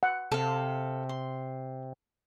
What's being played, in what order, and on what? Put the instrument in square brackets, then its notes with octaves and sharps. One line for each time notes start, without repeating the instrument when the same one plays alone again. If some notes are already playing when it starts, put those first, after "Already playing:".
[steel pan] F#5
[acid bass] C3 [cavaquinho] A4 F5
[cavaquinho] C6